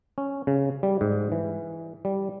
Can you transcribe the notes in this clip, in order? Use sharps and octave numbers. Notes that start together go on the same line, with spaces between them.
C#4
C#3
G3
G#2
E3
G3